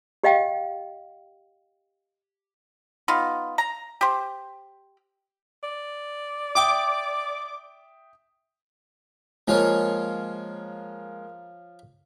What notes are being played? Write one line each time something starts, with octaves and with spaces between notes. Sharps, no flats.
G4 D#5 F5 G5
B3 D#4 F4
A#5
G4 C5
D5
E5 G5 D6 D#6
F3 G#3 A#3 F4 C#5